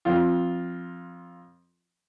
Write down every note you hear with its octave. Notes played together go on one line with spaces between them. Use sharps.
F2 F4